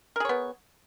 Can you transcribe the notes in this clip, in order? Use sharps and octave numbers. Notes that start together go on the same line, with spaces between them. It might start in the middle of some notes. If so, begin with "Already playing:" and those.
B3 G#4 A#4 C#5